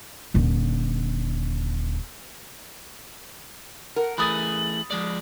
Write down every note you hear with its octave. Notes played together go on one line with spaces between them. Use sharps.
D#1 D3
A#4 F#5
E3 A3 G#4 B5 D#6 A6 F#7
F3 G#3 D5